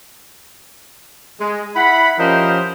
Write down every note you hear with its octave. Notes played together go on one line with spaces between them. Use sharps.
G#3
E4 F#5 B5
F3 C#4 G4 A#4 C5 D#5